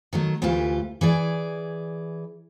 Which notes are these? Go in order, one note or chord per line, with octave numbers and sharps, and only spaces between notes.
D#3 F#3 A3
D2 E3 A3 F4 G4
E3 G#4 D5